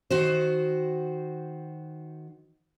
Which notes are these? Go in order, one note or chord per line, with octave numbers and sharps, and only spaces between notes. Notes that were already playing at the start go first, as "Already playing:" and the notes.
D#3 F#4 C5